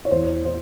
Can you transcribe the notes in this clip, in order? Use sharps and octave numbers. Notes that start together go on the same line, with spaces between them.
C#5
E2 C5
C5